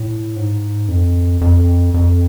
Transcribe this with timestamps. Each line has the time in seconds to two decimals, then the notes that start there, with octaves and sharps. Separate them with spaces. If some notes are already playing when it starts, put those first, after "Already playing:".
Already playing: A2
0.36 G#2
0.88 F2
1.41 F2
1.94 F2